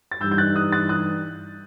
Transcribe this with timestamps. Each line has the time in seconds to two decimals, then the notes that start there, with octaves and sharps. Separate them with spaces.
0.12 A6
0.21 G2 E3 G3 D#4 E6 G6
0.31 G6
0.38 F#6 A6
0.56 D#6 F#6
0.72 F#6 A6
0.89 D#6 F#6